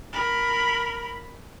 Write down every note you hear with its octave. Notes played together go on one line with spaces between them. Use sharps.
A#4 B5